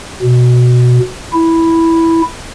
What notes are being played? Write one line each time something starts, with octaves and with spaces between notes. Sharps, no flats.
B2
E4